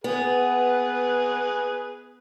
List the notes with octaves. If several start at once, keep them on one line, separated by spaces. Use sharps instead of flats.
B3 G#4 B4